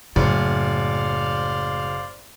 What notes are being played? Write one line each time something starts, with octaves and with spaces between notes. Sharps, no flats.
F#1 A2 C5 D5 F5